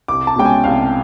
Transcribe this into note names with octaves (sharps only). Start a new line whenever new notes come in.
C2 D6
A5
B2 G#3 C#4 G5
G#5
C2 F5